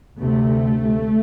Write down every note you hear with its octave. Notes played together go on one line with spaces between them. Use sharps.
D2 C3 A3